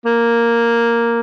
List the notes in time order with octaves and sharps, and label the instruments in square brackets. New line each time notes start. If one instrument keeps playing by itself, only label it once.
[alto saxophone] A#3